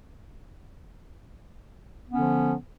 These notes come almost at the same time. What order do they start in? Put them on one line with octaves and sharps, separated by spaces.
B3 C#4 D3 F3